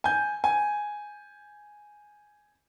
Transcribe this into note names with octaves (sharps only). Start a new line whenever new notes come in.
G#5 G6
G#5